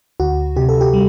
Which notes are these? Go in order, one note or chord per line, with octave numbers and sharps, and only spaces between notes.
D2 F#4
C3 G4
A4
G4
G3